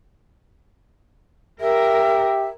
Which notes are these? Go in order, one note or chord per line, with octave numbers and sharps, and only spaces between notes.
G4 A#4 E5